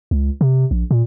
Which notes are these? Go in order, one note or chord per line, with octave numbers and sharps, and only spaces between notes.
C#2
C3
A#1
A#2